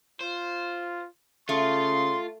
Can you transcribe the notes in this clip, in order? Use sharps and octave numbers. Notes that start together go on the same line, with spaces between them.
F4 C5
C#3 A3 F4 C6